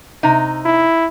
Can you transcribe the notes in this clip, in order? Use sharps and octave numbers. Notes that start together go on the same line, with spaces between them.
C3 D#4
E4